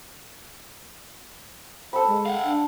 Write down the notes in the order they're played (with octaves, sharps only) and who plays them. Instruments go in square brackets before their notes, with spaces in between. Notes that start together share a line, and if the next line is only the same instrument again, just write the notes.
[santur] A4 B5 [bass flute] C5
[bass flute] G#3
[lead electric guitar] F5 F#5
[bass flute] D4